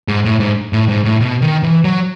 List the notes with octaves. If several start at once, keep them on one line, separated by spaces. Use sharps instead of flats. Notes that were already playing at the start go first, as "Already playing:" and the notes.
G#2
A2
G#2
A2
G#2
A2
B2
D#3
E3
F#3